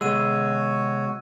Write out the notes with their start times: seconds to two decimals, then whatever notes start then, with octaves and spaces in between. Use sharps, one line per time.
0.01 C3 G#3 B3 F#4 G#4 C#5 E6 D#7